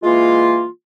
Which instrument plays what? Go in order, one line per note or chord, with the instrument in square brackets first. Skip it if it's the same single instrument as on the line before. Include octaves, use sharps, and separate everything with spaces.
[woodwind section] E3 G#3 A#3 F4